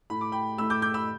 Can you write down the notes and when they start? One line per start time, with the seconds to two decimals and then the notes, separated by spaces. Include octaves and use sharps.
0.10 A2 A3 B5
0.21 D6
0.32 G5 B5
0.58 A2 A3 B5 E6
0.70 D6 G6
0.82 D6 G6
0.94 B5 E6